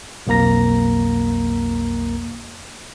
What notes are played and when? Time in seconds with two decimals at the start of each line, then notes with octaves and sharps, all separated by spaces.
0.27 B1 F2 A#3 A#5 A#6